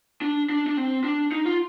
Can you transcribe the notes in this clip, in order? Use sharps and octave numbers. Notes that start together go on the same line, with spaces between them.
D4
D4
D4
C4
D4
D#4
F4